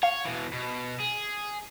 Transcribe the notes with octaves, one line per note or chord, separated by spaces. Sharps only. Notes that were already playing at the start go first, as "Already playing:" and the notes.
C#5 F5
B2 E3
B2
G#4